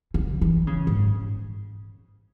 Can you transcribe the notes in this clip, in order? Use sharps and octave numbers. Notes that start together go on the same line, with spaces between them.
C#3
E3
C#3
G#2